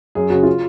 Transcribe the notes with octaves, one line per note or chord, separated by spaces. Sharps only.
F#2 G#4
C#3 F#4
F4